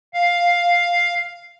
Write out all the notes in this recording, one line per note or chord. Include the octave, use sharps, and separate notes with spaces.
F5